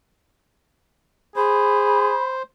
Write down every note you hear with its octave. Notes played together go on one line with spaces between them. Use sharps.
G#4 C5 B5